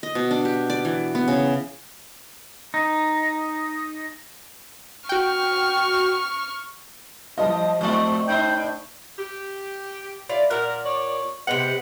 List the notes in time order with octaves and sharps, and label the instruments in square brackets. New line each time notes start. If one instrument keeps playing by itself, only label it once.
[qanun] D#5
B2
D4
G4
D5
E3
B3
C#3
[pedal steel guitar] D#4
[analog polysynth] F#4 G5 [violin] C#6 F6
[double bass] F3 G3 [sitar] E4 [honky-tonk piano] D#5 A5
[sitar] F3 E4 D5 [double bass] A3 C4
[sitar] A2 D#4 C5 [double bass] D4 [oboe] G5
[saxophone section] G4
[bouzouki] E4 F4 D5
[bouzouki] A#2 F#5 [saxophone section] A#4
[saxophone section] C#5 D5
[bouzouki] C3 G5 [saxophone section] G#3 B3 F#5